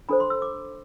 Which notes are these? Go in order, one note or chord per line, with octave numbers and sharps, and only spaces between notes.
D4 A4 C5 B5
C6
E6
D6